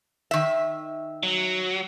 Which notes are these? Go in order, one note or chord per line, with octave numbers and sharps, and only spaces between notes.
D#3 E5
F#3